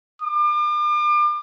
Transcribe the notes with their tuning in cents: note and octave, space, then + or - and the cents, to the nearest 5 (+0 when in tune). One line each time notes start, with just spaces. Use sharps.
D6 +40